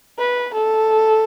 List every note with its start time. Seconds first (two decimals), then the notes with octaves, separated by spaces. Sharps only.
0.19 B4
0.54 A4